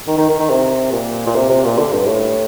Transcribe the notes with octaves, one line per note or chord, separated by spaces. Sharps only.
D#3
D#3
D#3
D#3
C3
A#2
A#2
C3
C3
A#2
D3
G2
A2